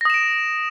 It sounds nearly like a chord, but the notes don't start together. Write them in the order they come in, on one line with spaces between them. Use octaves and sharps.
A#6 D#6 E7 D7